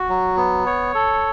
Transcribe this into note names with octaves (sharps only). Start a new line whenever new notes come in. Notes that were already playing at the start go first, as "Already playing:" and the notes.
Already playing: F#4
F#3
B3
C#5
A4